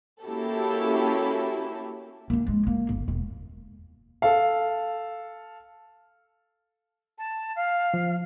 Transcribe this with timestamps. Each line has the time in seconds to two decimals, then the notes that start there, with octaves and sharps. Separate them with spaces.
0.23 A#3 C#4 E4 F#4 G4 A4
2.30 A#3 D4
2.48 G#3
2.67 A#3
2.89 G1
3.08 E1
4.22 A4 F5
7.18 A5
7.56 F5
7.94 F3